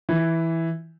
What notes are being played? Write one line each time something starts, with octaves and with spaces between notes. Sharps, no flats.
E3